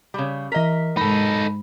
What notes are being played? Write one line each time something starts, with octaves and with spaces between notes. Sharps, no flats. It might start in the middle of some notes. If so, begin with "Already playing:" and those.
C#3 G3
E3 A#4 D#5 B6
G#2 D#4 A4 B5